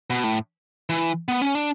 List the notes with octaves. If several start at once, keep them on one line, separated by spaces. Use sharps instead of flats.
B2
A2
E3
B3
C#4
D4